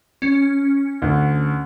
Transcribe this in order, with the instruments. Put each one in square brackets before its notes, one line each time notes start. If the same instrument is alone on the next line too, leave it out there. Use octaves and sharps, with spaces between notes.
[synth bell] C#4
[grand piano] D2